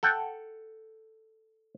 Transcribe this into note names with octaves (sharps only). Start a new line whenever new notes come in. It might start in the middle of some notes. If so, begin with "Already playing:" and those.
A4 F#5 G5